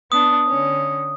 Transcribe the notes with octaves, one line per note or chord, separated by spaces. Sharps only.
B3 D4 D#6
D3 C#4